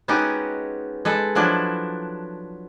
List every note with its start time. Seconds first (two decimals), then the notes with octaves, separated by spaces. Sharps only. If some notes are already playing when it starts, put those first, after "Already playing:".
0.08 G#3 B3 C#4 D#4 F#4 G4
1.05 G#3 A4 B4
1.35 F3 F#3 D4 E4